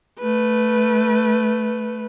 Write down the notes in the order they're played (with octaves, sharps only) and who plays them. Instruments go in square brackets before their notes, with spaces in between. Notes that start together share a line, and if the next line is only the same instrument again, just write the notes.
[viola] A3 B4